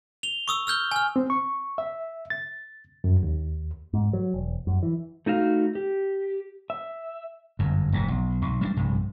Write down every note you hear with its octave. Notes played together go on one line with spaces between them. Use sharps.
F7 G7
C#6 D#6 E6
E6 F6 G6 G7
G#5 F6
C4
C#6
E5
A6
F#2
D#2
G#2
F#3
E1
F#2
E3
A3 D#4 F#4 F5
G4
E5
G1 F#2
F1 G#2 C3
B1
B1
G3 A#3 D4
A#1 G2 C3